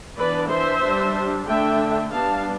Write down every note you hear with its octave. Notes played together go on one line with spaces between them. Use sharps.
E3 B3 D4 B4 D5
C5 E5
G3 D4
D3 A3 D4 E5 G5
G3 B3 D4 F5 A5